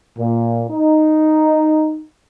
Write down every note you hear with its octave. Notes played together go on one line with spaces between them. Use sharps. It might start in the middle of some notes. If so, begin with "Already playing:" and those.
A#2
D#4